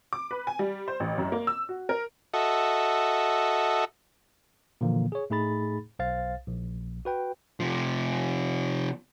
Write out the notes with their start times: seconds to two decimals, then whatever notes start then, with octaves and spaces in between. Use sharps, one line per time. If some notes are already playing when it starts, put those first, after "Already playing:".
0.13 D6
0.31 B4
0.47 G#5
0.59 G3
0.88 C5
1.00 A1
1.18 F#2
1.32 A#3
1.47 E6
1.69 F#4
1.89 A#4
2.34 F#4 A4 D#5 E5
4.81 A#2 D3 E3 F3 A#3
5.12 G#4 C#5
5.30 A2 A3 D#4 G#4 B5 A6
5.99 B1 C5 F5 A6
6.47 A#1
7.05 F#4 B4 G5
7.60 C3 F3